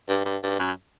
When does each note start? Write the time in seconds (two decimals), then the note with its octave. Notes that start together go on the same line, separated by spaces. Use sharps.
0.09 G2
0.25 G2
0.43 G2
0.59 F#2